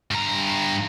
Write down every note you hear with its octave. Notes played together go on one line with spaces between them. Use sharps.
G2 A#5